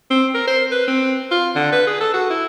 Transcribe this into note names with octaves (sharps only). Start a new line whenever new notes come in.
C4
A#4
C5
B4
C4
F4
D3
B4
G#4
A4
F#4
E4